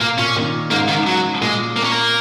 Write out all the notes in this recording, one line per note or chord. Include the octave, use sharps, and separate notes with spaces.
A#2 A#3
A#2 C#4
A#2 D#3
G#2 C#3 A#3
D#3
F#3
A#2 G#3
A#3
C#4
A#3